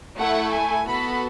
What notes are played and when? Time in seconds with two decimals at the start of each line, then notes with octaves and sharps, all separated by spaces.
0.17 A3 E4 A4 F#5
0.52 G#5
0.86 B3 F#4 A4 B5